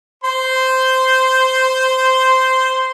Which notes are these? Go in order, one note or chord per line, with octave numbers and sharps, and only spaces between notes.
C5 C6